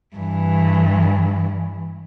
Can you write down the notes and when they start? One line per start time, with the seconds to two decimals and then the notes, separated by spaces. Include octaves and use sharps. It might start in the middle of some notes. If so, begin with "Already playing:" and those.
0.16 G2 E3